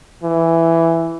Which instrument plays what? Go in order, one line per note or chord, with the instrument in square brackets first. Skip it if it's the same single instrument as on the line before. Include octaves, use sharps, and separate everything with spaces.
[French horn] E3